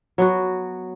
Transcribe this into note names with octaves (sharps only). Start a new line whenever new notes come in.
F#3 B3 F#4